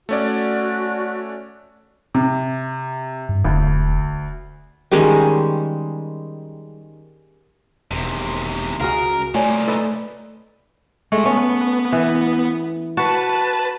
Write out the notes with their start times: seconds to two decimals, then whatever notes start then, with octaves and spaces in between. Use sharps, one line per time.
0.09 A3 C#4 F#4 D5
2.15 C3
3.29 G2
3.44 E1 D2
4.91 D#3 G3 G#3 C#4
7.91 E1 D#2 C3
8.80 C#2 F#4 G#4 A#4 F5
9.35 C2 A#2 A3 C#5 D5 G#5
9.68 A4 B4 D#5
11.12 G#3 A3
11.25 B3 C#4
11.92 E3
12.97 F#4 B4 A5